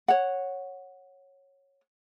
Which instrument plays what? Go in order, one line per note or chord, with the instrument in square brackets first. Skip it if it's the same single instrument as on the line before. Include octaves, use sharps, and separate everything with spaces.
[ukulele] C#5 F#5